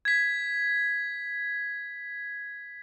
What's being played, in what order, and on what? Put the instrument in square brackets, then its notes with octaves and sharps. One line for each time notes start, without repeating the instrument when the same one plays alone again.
[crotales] G#6 B6